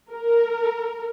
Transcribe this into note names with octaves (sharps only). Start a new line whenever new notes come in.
A#4